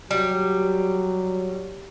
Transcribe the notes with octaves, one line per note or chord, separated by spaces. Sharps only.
F#3 G3